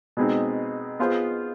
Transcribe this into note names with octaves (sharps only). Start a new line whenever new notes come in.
B2 G#3 C4 D#4
B3 F4 G#4 C5